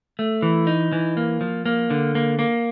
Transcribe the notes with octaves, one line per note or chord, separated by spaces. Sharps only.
A3
E3
D#4
E3
A#3
F3
A#3
D3
A#3
A#3